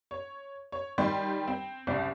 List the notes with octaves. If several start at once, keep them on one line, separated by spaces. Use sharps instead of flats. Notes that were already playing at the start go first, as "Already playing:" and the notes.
C#5
C#5
D#3 G3 G5 C6
C4
F#1 C2 D5